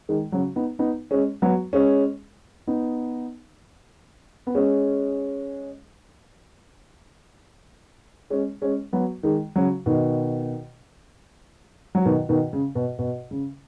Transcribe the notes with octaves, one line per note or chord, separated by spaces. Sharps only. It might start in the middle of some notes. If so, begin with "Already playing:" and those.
D#3 G#3
C#3 F#3
B3 D#4
B3 D#4
G#3 C#4
F#3 B3
G#3 C#4
B3 D#4
B3
G#3 C#4
G#3 C#4
G#3 C#4
F#3 B3
D#3 G#3
C#3 F#3
B2 D#3
F#3
B2 D#3
B2 D#3
C#3
B2
B2
C#3